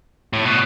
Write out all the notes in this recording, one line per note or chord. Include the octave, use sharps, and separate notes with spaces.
A2
B2